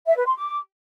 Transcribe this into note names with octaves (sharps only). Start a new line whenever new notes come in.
E5
B4
C6
D6